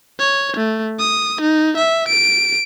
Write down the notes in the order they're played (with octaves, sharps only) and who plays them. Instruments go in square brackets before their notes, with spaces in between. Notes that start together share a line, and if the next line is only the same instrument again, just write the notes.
[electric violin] C#5
A3
D#6
D#4
E5
D7